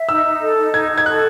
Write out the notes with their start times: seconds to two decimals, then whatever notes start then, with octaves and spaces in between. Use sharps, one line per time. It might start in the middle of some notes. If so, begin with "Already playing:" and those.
Already playing: E5
0.09 D#4 E6
0.25 D#4
0.41 A4
0.57 D#4
0.73 D#4 G#6
0.90 D#4
0.98 G#6
1.06 A4 F#6